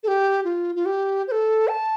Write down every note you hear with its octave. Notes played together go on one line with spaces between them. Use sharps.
A4
G4
F4
F4
G4
C5
A4
A5